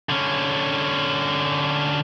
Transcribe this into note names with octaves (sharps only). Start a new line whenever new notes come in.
D3 C#4